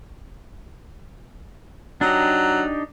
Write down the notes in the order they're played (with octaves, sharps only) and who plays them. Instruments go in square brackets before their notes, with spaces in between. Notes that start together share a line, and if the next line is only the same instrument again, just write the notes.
[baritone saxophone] F#3 [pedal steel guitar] D4 D#4 G4